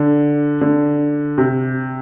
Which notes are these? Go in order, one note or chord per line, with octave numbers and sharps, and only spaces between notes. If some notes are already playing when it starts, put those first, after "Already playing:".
Already playing: D3
D3
C3